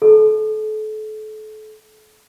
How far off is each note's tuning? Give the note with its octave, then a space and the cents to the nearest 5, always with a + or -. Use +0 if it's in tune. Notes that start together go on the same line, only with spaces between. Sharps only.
A4 -35